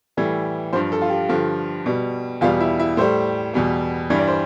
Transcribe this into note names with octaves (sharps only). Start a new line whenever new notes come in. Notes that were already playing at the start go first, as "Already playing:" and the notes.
A2 E3 G3
G2 F3 C5
A4
F4
G4
G2 D3 F3
B2 G3
E2 B2 G3 F4
E4
E4
A2 G3 C5
E2 B2 G3
G2 E3 G3
D5
C5